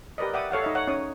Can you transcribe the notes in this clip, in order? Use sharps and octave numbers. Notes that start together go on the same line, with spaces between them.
G4 A#4 B4 D5 D#5
D5 E5 F#5 G5 D6 D#6
A4 C#5 F5 F#5
D#4 D#5 E5
C#5 F#5
C#4 D#4 C#5 D#6